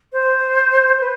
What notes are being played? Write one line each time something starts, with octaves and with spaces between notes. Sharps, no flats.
C5
B4